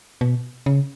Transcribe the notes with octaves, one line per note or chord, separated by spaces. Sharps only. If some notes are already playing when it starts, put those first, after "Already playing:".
B2
C#3